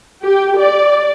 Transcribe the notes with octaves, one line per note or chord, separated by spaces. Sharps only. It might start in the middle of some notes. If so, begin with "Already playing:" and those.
G4
D5